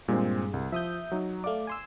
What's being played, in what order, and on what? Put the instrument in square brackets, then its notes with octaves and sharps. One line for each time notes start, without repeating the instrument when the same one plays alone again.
[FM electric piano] G2 G#4 [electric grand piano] A#2 G#3 C4
[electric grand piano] C2
[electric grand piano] F3 [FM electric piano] E5 D#6 G6
[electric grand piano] F#3 D#4
[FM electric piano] A3 D5 [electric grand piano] F5 D6
[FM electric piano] G#5 C6 E6